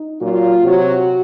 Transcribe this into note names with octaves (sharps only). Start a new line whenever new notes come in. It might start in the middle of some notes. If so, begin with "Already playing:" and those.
Already playing: D#4
A#2 F#3 F4
C3 F#3 F#4